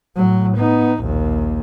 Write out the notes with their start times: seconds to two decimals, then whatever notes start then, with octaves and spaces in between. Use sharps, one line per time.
0.16 A2 F#3
0.57 B3 D#4
1.02 A#1 D#2